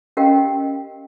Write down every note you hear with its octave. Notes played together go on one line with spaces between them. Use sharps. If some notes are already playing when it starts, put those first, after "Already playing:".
C#4 G4 A#4 D#5 F5 G5